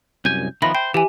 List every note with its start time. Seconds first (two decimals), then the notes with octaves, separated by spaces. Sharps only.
0.25 C2 F#2 G#5 G6
0.62 D#3 F3 B3 E5 B5 A#6
0.75 C5 G5
0.94 E3 G4 E5 G#5